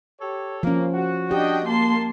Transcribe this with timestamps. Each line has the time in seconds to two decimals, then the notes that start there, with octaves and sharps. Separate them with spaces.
0.21 G4 A4 C#5
0.63 F3 A#3 C#4
0.94 F#4
1.31 D4 G4 D#5 G5
1.68 A#3 A5 C6